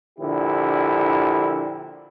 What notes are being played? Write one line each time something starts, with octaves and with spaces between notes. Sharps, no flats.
A#1 D3 E4 G4